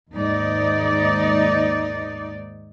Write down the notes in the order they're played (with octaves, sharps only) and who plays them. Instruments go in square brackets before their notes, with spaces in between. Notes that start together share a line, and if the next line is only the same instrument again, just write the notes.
[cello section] D#2 G#2 D#4 D5